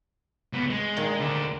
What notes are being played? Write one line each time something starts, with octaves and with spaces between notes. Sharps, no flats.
C#2 B3
G#3
A#2 D#3
D2 D4